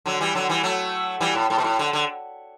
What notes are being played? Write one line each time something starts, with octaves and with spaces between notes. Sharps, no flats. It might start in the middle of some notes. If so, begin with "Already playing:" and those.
D3 F#3
E3 G3
D3 F#3
E3 G3
F#3 A3
E3 G3
A2
A2
B2
A2
D3
D3